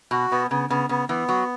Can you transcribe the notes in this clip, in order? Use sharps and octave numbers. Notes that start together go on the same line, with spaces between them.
B2 F#4
B2 B3
C#3 B3
C#3 B3
C#3 B3
E3 B3
F#3 F#4